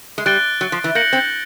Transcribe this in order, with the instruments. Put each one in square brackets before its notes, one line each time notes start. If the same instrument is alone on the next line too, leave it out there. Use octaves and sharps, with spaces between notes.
[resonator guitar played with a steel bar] G#3
[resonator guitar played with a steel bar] G3 [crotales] F#6 A6 D7 G7
[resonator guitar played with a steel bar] F#3
F3
E3
[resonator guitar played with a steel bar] A#3 [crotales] G6 A#6 C#7 F#7
[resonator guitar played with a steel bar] C4